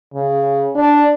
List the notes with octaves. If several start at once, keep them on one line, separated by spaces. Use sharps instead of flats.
C#3
D4